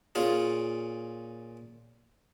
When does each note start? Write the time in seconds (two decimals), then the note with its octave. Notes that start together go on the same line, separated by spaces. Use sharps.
0.15 A#2 C#4 F4 G#4